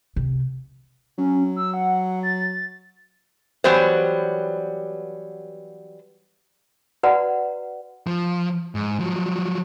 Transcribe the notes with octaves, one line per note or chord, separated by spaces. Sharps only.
C3
F#3 C#4
E6
F#5
A6
E3 F#3 G3 B3 C5
F#4 B4 D5 F#5 A#5
F3
G#2
F3 F#3